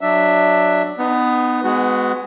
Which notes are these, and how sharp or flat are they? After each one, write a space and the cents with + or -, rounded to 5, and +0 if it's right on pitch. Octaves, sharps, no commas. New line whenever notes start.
F#3 +5 D4 +15 E5 +0
B3 +15 D#4 -25
G#3 +0 B3 +25 F#4 -10